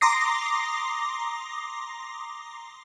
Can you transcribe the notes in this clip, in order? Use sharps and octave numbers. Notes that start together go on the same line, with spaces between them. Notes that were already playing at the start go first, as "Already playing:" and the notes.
A#5 C6 D6 D#6 A#6 C7